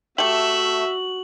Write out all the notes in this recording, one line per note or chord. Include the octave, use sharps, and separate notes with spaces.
A3 F#4 G4 E5 F#7